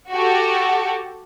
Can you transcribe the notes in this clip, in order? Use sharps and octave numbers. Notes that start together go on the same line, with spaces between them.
F#4 G4 A4